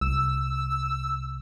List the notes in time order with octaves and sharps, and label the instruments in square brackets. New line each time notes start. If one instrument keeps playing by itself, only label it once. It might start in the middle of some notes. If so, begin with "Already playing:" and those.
[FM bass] C2 [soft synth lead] E6